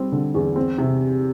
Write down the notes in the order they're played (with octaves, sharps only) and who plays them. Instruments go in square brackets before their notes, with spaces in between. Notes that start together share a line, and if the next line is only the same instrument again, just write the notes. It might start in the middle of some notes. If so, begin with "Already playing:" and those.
Already playing: [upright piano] G3 C4
D3
E2
C4
C3